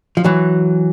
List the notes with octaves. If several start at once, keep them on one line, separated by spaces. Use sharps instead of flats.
F3
E3 F#3